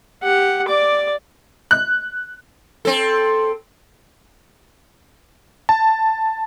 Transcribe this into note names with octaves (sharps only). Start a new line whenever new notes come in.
G4 F#5
D5 D6
F#6
C4 A4
A5